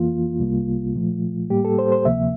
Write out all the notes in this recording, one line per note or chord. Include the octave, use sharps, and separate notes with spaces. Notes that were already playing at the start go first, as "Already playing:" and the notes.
Already playing: F2 E3 A#3 F4
C2 C3 G3 A#3
A#2 F3 A3
A2 G3 A#3 G4
A4
C5
C5
D2 C3 F3 A#3 E5